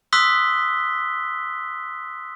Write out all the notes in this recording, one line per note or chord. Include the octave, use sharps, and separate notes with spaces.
C6 D#6 E6 F#6 B6 G7